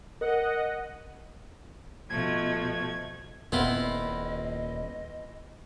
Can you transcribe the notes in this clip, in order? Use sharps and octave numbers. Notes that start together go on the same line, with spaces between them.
A#4 D#5 F#5
B2 F3 A3 G#6
D#1 A#2 B3 C4 E4 F4 D#5